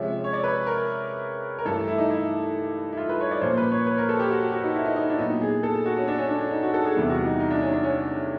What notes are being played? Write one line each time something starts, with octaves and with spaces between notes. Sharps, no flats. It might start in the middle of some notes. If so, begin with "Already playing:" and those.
Already playing: C3 F3 G#3 C#4 E5
C#5
D5
B4
A#4
A#4
G2 E3 A3 A4
E4
D#4
E4
E4
F4
B4
C#5
D5
A#2 F3 A#3 C#4 C5
B4
C#5
B4
A#4
A4
G4
F#4
F#4
D#4
E4
D#4
D#4
D4
A#2 F#3 B3 D#4
G#4
A4
F#4
C#4
D4
C#4
D4
D4
D#4
F#4
A4
G#4
E2 C3 E3 G3 B3
F#4
D#4
D#4
D4
C#4
D4
C#4